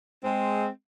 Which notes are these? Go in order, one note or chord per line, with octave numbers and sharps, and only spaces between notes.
G#3 C4